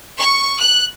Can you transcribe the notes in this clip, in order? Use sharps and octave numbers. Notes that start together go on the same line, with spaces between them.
C#6
F#6